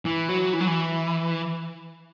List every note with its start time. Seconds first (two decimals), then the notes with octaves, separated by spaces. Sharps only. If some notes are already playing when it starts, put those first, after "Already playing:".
0.05 E3
0.29 F#3
0.53 E3
0.60 F#3
0.67 E3